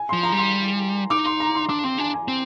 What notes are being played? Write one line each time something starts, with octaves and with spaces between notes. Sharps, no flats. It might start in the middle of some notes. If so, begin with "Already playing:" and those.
Already playing: G#5
F3 C6
A#5
G3
C6
D#4 D6
C6
A#5
C6
D4 D6
C4 C6
D4 G#5
G#5
C4